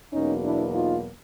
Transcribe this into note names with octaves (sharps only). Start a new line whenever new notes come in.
E2 B2 F#3 A#3 C#4 D#4
D4 E4
D#4 F4